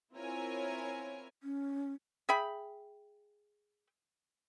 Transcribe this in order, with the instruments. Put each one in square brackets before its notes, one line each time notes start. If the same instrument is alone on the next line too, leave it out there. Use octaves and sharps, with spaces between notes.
[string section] C4 E4 F4 A#4 C#5 G#5
[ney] C#4
[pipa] G#4 E5 G5 B5